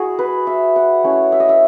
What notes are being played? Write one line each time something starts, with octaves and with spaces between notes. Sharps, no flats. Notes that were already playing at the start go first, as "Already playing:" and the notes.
Already playing: E4 F#4 G#4
B4
E5
F#5
A3 C#4 E4 F#5
E5
D#5
E5